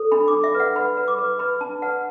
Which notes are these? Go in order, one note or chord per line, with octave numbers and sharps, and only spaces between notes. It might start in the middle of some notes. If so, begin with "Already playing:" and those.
Already playing: A4
D4 B5
D6
D4
E5
B4
F#5
B4 B5
B4
D6
B4
B4 B5
D4 A5
B4 F#5